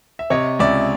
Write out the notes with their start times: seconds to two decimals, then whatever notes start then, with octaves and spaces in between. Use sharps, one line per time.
0.19 E5
0.30 C3 C#5 D#5
0.59 C#2 D5 E5